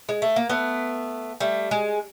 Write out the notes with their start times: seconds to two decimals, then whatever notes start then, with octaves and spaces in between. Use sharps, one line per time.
0.09 G#3
0.22 A3
0.36 A#3
0.49 A3 B3
1.40 G3 A3
1.71 G#3